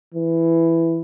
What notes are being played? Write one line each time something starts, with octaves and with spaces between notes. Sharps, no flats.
E3